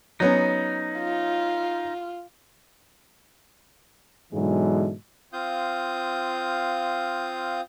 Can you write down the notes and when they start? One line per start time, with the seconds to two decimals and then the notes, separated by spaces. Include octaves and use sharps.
0.20 F#3 B3 C#4 D#4
0.99 F4
4.33 G#2 B2 D3 E3 F#3 G#3
5.33 C4 F4 F5 D#6 G6